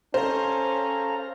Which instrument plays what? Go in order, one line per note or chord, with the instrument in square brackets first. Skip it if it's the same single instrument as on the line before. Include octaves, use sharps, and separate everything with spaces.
[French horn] C#4 [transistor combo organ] A4 F5 A#5 [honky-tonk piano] C5